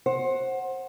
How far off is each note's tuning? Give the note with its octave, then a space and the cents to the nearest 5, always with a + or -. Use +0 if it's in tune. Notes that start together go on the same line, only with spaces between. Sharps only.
C5 +25 F#5 +0